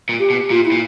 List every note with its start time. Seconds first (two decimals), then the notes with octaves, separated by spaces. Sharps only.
0.09 A#2
0.19 G4
0.30 B2
0.50 A#2 F4
0.65 E4
0.72 A#2